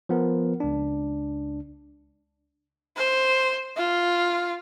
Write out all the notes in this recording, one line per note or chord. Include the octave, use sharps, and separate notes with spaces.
F3 B3 A#4
C#2 D4
C5
F4